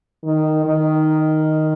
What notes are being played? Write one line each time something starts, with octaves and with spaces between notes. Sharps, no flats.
D#3
D#3